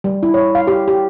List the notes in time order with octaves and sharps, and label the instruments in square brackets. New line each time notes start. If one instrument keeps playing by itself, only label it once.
[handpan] G3
E4
C#5
F5
G4
G4